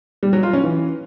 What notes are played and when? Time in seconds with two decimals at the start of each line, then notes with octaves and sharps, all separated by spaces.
0.23 G3
0.33 F#3
0.43 F4
0.53 C#4
0.64 E3